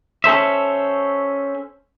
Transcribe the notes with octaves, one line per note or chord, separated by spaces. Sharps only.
C#4 A4 C5 E5